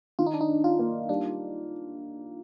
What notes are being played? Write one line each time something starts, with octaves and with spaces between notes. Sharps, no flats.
D#3 F4
D#4
D4
D#4
D4
F4
A#3
G3 D4